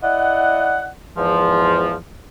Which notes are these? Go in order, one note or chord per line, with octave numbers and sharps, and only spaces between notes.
E4 D5 D#5 F#5
E2 G#2 F3